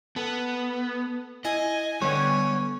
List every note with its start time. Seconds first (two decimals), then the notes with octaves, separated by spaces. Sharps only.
0.16 B3 A4
1.45 E4 D#5 G#5
2.02 D3 G3 B3 C#5